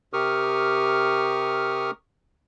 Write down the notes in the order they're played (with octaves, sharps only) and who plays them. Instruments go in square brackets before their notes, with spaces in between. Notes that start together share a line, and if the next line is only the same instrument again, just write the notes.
[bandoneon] C3 G4 A#4 C#6 D#6 F6